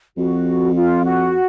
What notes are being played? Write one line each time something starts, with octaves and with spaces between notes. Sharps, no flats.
F2 F#4
F4
F#4